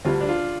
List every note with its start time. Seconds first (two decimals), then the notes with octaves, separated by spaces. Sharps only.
0.05 D2 D3 G3 F4
0.21 D4
0.29 F4